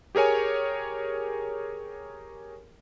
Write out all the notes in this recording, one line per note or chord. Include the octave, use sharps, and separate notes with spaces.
G4 G#4 A#4 C#5 G#5